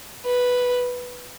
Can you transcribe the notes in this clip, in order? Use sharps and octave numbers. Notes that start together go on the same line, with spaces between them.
B4